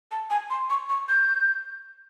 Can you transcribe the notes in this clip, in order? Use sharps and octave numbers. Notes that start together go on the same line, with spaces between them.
A5
G#5
C6
C#6
C#6
G6